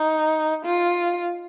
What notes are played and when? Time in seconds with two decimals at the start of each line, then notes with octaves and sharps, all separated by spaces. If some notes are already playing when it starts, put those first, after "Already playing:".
Already playing: D#4
0.65 F4